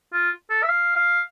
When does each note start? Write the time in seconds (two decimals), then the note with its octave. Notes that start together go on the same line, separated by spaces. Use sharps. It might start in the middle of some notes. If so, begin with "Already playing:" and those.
0.13 F4
0.50 A4
0.63 E5
0.69 F5
0.96 F5